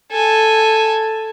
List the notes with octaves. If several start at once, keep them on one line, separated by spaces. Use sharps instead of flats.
A4 G#5